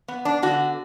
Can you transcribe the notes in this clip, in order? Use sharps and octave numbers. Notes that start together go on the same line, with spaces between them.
B3
D4
D3 F#4